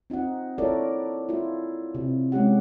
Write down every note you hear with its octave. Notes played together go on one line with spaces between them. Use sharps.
C4 D#4 F4 F#5
E4 F4 A4 A#4 C#5 D5
E4 F4
C3
G#3 C#4 G4 F#5